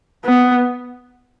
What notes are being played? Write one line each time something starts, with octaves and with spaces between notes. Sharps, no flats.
B3